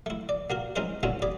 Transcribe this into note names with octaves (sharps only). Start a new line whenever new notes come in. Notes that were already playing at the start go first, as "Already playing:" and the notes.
A3 E4
D5
A#3 F#4 A#4
G#3 C#4 E4 A#4 C5
B2 D3 C#4 E4 F#4
G#4 D5 B5